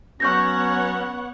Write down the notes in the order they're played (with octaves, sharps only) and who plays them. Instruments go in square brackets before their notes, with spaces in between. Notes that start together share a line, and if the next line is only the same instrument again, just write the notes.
[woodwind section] F#3 C#4 [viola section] B3 C#5 F#5 [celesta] C#6 G6 A#6